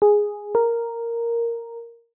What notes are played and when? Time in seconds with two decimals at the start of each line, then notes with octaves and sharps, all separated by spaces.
0.02 G#4
0.55 A#4